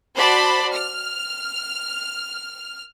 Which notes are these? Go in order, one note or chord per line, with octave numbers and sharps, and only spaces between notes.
F#4 C5 D5 A5 B5
F6